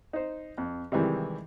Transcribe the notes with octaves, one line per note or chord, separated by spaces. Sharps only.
D#4 C5
F2
C3 D#3 E3 G3 G#3